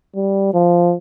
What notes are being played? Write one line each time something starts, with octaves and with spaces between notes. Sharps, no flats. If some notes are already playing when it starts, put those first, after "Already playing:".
G3
F3